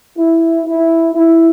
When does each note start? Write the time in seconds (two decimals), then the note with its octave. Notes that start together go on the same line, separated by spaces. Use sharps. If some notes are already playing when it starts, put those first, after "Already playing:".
0.18 E4
0.67 E4
1.15 E4